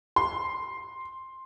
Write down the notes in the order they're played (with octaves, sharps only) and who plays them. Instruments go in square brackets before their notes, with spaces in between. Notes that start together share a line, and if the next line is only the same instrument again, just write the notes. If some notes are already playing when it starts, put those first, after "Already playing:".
[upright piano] C6